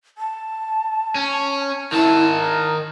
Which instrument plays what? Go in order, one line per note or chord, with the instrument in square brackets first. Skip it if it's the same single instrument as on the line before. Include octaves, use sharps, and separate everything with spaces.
[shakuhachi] A5
[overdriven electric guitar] C#4
[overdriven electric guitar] D#3 A5 [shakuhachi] E4
[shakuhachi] A#5